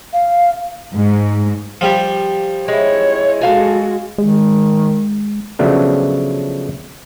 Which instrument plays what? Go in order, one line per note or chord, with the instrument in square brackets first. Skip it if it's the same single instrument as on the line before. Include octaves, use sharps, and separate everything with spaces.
[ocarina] F5
[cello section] G#2
[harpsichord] F3 G3 G4
[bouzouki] G#3 E4 [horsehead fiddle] C#5
[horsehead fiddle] G#3 F#4 [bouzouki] A4 F5 G#5
[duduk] D#3 [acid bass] G#3
[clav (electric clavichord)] C#3 F3 F#3 A3 B3 D4